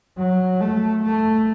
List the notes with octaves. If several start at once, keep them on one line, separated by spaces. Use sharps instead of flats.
F#3
A3
A3